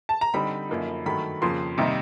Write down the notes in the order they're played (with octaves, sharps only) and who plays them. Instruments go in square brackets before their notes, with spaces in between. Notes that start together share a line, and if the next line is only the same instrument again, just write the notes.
[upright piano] A5
A#5
D3 G3 C4 D#4 B5
F#2 D3 F3 A#3 D#4
G2 D#3 F#3 A3 B5
F2 C#3 F3 A#3 C6
C3 D#3 G3 A#3 D#4